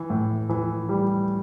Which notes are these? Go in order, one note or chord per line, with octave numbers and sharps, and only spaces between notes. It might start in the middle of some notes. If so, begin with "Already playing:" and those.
Already playing: E3
A2
E3
G3